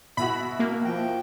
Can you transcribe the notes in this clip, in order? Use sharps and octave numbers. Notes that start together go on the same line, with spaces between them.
B2 E4 F#4 B5
A#3
F3 G5